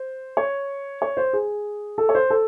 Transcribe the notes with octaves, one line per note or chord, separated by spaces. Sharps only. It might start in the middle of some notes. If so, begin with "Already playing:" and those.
Already playing: C5
C#5
C#5
C5
G#4
A4
C#5
C5
A4